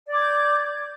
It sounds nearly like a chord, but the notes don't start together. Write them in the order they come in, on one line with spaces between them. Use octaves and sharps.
D5 D6 G#6 G6